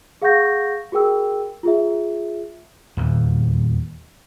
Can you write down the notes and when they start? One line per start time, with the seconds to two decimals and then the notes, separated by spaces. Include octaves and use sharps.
0.22 G#4 F5 F#5 C#6 G6 A#6
0.92 F#4 G#4 A#4 G5 E6
1.63 F4 G#4 E5
2.97 D#1 E2